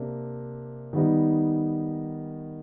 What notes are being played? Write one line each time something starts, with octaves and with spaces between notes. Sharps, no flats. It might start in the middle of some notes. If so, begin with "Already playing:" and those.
Already playing: C3 A#3 D4
D#3 G3 B3 D#4